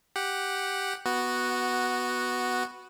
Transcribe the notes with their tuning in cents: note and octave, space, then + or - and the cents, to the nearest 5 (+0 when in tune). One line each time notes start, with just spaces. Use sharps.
G4 +0 F#5 +0
B3 -5 F#4 +0